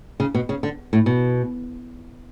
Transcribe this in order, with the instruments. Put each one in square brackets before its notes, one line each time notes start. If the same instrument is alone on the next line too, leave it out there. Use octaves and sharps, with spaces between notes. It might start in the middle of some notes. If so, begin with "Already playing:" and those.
[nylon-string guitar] C#3
B2
C#3
D3
A2
B2